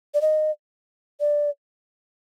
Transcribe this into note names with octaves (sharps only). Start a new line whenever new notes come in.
D5
D#5
D5